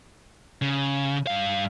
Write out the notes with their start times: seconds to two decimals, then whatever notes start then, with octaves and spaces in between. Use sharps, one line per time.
0.62 C#3
1.27 G2 F5